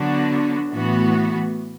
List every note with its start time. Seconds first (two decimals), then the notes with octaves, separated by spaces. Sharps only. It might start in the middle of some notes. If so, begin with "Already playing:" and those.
Already playing: D3 F#3 B3 D4 F#4
0.72 A2 E3 B3 F#4